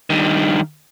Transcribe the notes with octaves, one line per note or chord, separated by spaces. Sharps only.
G2 D#3